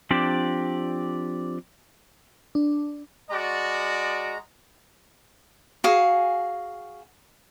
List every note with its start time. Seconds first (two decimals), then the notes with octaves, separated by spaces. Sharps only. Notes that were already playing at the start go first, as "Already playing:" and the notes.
0.11 F3 C4 D4 G4 D5
2.55 D4
3.30 G#3 F#4 D5 A#5
5.84 F#4 G#4 F5 G#5